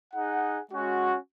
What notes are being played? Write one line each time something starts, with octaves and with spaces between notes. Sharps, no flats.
D#4 G#4 F#5
G#3 C#4 F#4